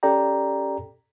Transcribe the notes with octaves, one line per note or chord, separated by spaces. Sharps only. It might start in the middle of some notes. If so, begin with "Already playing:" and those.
C#4 G4 A4 D5 G5 A#5